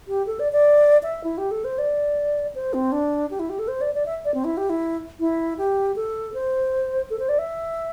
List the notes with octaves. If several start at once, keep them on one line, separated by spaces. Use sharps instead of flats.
G4
A4
D5
D5
E5
E4
G4
A4
C5
D5
C5
C4
D4
G4
E4
G4
A4
C5
D5
D5
E5
D5
C4
E4
G4
E4
E4
G4
A4
C5
A4
C5
D5
E5